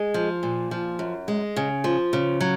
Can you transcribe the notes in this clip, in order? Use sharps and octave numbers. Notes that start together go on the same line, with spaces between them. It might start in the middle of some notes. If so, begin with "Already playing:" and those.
Already playing: G#3
F3
A#2
F3
F#2
G#3
C#3
F3
C#3
F#3